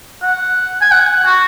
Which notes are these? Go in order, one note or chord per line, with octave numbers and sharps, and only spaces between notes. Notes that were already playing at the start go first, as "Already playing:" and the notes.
F#5
G#5
F#5
F#4